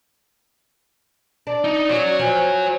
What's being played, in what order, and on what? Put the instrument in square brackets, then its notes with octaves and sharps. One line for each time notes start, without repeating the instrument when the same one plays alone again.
[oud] D4 [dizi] D5
[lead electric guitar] D#4
[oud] C#4 [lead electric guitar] F#4 C#5
[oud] F3 [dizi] G#5